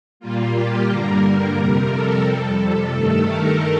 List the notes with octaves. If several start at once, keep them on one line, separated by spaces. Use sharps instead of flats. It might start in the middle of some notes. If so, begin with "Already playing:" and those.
A#2 G3 A#3 F4
G4
G2 D3 G3 A#3 A#4
A#4
F2 C3 G3 A#4
A4
F2 C3 G3
G2 D#3 A3 A4
A#4